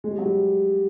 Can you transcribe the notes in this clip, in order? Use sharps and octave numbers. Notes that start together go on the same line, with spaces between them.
G#3
G3
F#3
G3